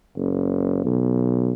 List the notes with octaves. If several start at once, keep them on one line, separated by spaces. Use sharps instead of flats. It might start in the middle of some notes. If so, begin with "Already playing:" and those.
F#1
B1